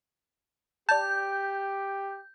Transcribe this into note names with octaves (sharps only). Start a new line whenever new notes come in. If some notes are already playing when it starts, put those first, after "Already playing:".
G4 D5 A5 G6